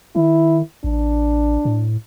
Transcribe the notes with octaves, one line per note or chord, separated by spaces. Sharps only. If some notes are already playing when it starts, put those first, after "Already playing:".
D#3 E4
A1 D4
A2